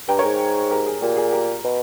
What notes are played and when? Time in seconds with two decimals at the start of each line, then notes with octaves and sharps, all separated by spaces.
0.08 G2 G5 A#5
0.19 A#4 C#5
0.24 G#2
0.71 G4 A#4
0.86 G#4
1.01 A#2 G4
1.17 G#4
1.33 G4 A#4
1.64 B2